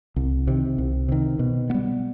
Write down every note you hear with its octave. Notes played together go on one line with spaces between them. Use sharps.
C2
C3 D#3
C2
C3 D#3
B2
G3 B3